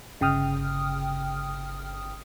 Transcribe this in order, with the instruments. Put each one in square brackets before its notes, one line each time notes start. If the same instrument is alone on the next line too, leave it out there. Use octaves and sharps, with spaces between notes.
[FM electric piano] G1 C#3 G5 D#6 F6